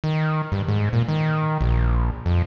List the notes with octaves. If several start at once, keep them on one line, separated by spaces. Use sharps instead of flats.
D#3
G2
G#2
A#2
D#3
A#1
F2